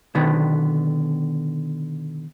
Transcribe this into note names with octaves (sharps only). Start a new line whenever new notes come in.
B2 D3 D#3 B3